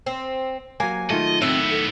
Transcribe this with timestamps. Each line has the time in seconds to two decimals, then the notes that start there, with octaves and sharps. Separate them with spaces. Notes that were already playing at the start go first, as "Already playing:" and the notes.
0.06 C4
0.80 F#3 A#3 G#5
1.10 D#3 A3 F4 D#5
1.42 A2 B3 C4 E5
1.69 A4